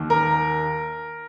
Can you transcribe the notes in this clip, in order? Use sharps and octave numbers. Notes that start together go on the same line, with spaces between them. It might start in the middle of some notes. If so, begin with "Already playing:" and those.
Already playing: D#2 D#3
A#4